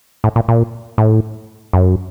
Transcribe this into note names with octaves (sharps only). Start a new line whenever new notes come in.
A2
A#2
A#2
A2
F#2